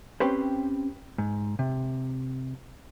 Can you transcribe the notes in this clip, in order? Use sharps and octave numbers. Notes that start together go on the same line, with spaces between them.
C4 C#4 G4 B4 C5
G#2
C3